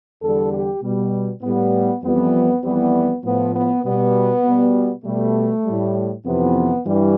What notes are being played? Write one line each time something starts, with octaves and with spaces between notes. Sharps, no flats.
E2 D3 G3 A4
G4
B2 G3
A2 G3 B3
F2 E3 G3 B3
F2 E3 G3 B3
A2 F3 B3
B3
B2 G3 B3
B2 G3
B2 G3 A3
A2 G3
F2 C3 E3 B3
G2 E3 G3